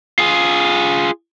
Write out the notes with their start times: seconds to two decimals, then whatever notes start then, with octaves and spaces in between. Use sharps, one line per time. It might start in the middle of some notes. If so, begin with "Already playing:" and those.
0.19 F4 G#4